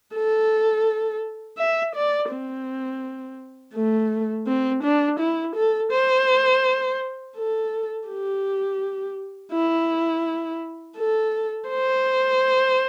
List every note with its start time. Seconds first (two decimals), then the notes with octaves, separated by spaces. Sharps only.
0.14 A4
1.58 E5
1.95 D5
2.30 C4
3.75 A3
4.47 C4
4.83 D4
5.19 E4
5.55 A4
5.92 C5
7.37 A4
8.08 G4
9.53 E4
10.97 A4
11.70 C5